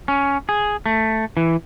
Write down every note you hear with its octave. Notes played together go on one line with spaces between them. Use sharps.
C#4
G#4
A3
E3